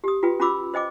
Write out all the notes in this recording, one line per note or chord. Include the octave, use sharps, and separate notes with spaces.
G4 D#6
F4 F#4 B4 G5
C#4 F4 F#4 B5 D6 E6
C5 D#5 G5 D6